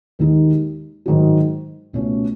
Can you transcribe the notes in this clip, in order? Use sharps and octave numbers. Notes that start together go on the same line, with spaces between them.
D#2 D#3 G#3 D#4
G#2 D#3 F#3
C#2 B2 A3 C#4